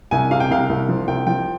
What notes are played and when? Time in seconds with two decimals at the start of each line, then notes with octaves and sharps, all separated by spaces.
0.11 C2 G#5
0.31 C3 F5
0.40 G5
0.50 C2 F5
0.69 C2
0.89 F3
1.07 C2 G5
1.27 F3 G5